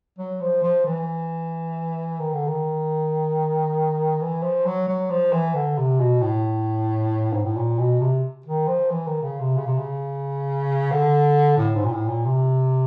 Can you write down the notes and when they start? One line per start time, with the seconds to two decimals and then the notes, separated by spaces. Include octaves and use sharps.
0.19 F#3
0.41 F3
0.63 F3
0.85 E3
2.19 D#3
2.33 D3
2.47 D#3
4.21 E3
4.43 F3
4.66 F#3
4.88 F#3
5.10 F3
5.33 E3
5.55 D3
5.78 C3
6.00 B2
6.21 A2
7.33 G#2
7.44 A2
7.57 A#2
7.79 B2
8.00 C3
8.46 D#3
8.68 F3
8.90 E3
9.06 D#3
9.23 C#3
9.40 C3
9.57 C#3
9.67 C3
9.78 C#3
10.91 D3
11.58 A2
11.75 G#2
11.85 A#2
11.92 A2
12.08 A#2
12.25 C3